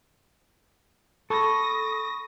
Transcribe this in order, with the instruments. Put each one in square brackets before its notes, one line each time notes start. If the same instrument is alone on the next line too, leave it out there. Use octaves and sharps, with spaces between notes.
[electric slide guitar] A4 [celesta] B5 C#6 [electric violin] D#6 A#6